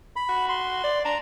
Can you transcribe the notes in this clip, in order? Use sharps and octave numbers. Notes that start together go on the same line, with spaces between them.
B5
F#4
C6
D5
D4 A#5